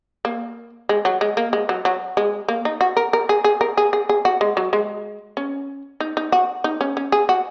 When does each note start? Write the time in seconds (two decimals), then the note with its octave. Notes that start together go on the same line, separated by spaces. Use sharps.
0.25 A#3
0.89 G#3
1.05 F#3
1.21 G#3
1.37 A#3
1.53 G#3
1.69 F#3
1.85 F#3
2.17 G#3
2.48 A#3
2.65 D#4
2.81 F#4
2.97 A#4
3.13 A#4
3.29 G#4
3.44 G#4
3.61 A#4
3.77 G#4
3.93 G#4
4.09 G#4
4.25 F#4
4.41 G#3
4.57 F#3
4.73 G#3
5.37 C#4
6.00 D#4
6.17 D#4
6.32 F#4
6.64 D#4
6.81 C#4
6.97 C#4
7.12 G#4
7.29 F#4